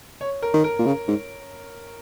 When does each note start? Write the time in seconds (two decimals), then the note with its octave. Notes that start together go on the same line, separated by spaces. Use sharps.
0.21 C#5
0.42 A#4
0.53 D#3
0.64 A#4
0.79 A#2
0.86 C#3
1.08 G#2